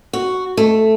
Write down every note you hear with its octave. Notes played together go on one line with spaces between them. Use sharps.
F#4
A3